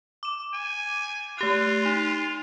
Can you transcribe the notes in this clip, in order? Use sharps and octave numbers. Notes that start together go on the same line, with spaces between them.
D6 E7
G#5
A3 F4 G4 F#6
D#4